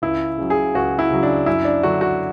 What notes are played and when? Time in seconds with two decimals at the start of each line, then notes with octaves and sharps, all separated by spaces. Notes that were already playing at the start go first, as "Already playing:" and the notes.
0.02 C#2 E4
0.38 C#3 F#3
0.50 G#4
0.74 C#2 F#4
0.99 E4
1.11 C#3 F#3
1.23 D4
1.46 F#2 E4
1.65 D4
1.83 D3 F#3 F#4
2.01 F#4